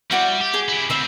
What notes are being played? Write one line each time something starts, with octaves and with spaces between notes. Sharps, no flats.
G3 E4 F#4 D5
G4
G#4
E4 G4
D2 C4 E5 B5